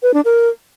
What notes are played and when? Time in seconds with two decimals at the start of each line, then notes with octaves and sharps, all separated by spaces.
0.03 B4
0.14 D4
0.25 A#4